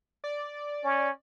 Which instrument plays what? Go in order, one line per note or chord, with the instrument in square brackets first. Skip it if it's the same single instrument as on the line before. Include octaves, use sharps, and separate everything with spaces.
[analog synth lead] D5
[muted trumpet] C#4